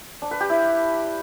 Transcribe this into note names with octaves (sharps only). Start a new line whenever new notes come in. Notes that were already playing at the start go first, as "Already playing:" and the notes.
D4
B4
G4
E4